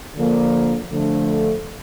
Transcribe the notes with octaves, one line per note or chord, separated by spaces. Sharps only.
D3 F3 A#3
D3 F3 A3